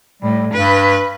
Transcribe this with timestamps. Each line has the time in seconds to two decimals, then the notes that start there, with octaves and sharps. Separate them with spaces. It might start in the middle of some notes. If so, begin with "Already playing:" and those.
0.22 A2 G3
0.53 G2 B4